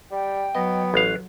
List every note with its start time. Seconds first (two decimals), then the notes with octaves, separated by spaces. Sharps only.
0.11 G3 G5
0.55 F#3 B3 D#5
0.94 A1 B4 F5